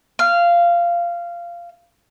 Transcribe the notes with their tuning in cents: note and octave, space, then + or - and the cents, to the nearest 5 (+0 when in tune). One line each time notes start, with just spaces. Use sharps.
F5 -15